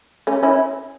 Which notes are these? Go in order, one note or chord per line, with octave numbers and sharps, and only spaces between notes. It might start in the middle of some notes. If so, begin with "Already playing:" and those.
A3 C#4
C#4 E4